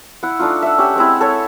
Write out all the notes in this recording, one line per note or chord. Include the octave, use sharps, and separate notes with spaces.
E4 F#5
A3 D4 D#4 F4
E5 F#5
C#4 G4 E5 F#5
G#3 C4 E4
A4 C#5